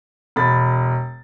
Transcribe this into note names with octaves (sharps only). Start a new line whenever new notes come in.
E1 B5 A6